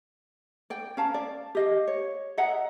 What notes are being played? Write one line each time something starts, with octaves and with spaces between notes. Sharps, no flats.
D5 G5
C#4 F5 A5 A#5
D5
G4 D#5 F5
C#5
D#5 E5 F#5 A#5